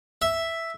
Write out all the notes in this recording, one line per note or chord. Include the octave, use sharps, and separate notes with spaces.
E5